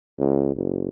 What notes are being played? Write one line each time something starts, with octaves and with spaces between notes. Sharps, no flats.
C#2
F#1